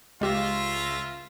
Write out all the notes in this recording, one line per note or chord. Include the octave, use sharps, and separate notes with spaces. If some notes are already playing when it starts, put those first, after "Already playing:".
C#2 G#3 F4 G4 E5 A#6